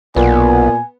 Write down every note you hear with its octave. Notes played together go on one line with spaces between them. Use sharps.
B1 A#2 B3 G#5